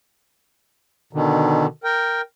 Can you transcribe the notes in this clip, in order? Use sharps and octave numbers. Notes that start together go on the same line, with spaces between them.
B2 D3 D#3
A#4 G5